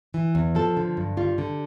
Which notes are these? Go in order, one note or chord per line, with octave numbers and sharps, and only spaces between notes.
E3
E2
F3 A4
D3
G2
G3 F4
D3